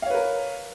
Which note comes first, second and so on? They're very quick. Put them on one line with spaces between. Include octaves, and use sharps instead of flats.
F5 C#5 B4 A#4